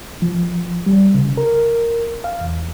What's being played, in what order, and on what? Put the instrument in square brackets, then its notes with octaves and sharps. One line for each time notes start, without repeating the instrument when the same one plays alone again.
[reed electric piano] F3
G3
C#3
A#4
F5
E2